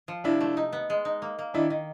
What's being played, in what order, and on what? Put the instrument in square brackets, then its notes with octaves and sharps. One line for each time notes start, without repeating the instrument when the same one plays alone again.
[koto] F3
[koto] C3 [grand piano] D4 E4
[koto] A3
D#4
B3
G#3
D#4
A#3
A#3
[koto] D#3 [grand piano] D4 E4
[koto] D#3